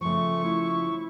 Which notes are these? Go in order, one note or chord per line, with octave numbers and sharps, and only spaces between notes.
C#3 F3 A3 C#6
E4